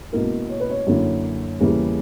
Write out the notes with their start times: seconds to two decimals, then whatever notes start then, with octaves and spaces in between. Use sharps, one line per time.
0.13 C#2 B2 A#3 E4 A#4
0.49 C#5
0.60 B4
0.70 C#5
0.87 F#2 D3 A#3 E4
1.60 E2 C#3 G3 A#3 E4